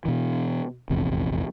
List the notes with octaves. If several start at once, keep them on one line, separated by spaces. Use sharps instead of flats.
B2 E3
F1 A#1 E2 C3